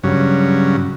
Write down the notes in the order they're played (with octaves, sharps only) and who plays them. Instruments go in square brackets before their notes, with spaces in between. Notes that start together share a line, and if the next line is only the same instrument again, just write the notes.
[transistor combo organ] G2 C#3 F#3